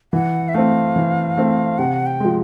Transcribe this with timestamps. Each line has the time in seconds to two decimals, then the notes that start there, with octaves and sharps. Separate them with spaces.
0.13 E3 F#5
0.49 E5
0.54 A3 C4 F5
0.96 E3
1.37 A3 C4
1.78 C3 F#5
2.06 G5
2.20 F3 G#3